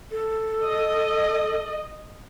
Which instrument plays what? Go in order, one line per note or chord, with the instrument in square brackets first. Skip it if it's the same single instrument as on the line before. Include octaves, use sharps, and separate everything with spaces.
[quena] A4
[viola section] D#5